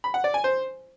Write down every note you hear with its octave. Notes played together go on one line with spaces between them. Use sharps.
B5
F#5
D5
G#5
C5